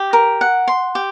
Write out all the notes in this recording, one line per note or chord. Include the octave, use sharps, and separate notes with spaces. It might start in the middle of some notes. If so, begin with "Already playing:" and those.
Already playing: G4
A#4
F#5
C6
G4